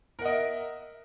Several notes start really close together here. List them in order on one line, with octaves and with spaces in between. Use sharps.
A#4 F#5 D#5 E5